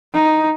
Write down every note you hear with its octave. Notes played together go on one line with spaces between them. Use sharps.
D#4